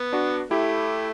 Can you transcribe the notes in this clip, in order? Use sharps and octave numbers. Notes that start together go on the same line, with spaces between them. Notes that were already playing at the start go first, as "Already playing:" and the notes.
Already playing: B3
D4 F#4
A3 E4 G4